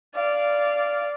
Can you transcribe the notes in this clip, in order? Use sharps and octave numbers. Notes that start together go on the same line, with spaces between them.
D5 F5